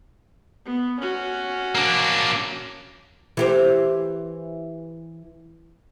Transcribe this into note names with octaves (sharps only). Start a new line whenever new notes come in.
B3
C#4 F#4
A#3 D4
E3 G4 C5